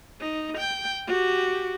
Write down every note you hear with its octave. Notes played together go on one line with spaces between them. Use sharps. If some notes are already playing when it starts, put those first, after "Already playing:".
D#4
G5
F#4 G4